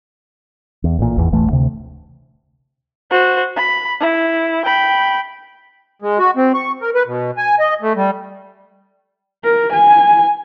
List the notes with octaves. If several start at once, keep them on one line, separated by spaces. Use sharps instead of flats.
E2
A1 A#2
G#1 E2
E1 A1 E3 A3
D2 C3
F#4 C5
B5
E4
G5 B5
G#3
F#4
C4
C#6
A#4
B4
B2
G#5
D#5
A3
G3
A#4
G#5